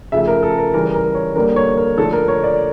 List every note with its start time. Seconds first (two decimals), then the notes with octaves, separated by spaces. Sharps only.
0.12 C#3 F3 A3 E5
0.28 A#4
0.43 A4
0.58 A#4
0.74 C#3 E3 G3 A#4
0.94 A#4
1.15 C#5
1.36 D3 G3 A#3 A#4
1.56 C#5
1.77 A#4
1.98 D3 F3 A3 A4
2.13 A#4
2.28 C#5
2.44 D5